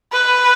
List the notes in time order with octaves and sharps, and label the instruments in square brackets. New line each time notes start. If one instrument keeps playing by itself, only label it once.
[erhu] B4